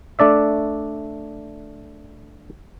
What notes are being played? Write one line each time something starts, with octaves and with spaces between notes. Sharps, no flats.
A3 D4 D5 E5